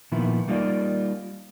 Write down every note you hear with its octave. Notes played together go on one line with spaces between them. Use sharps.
A#2 D#3 F3 B3 E4
G3 A#3 D#4 F4 D5